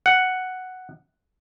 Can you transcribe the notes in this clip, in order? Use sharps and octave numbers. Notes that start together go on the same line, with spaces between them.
F#5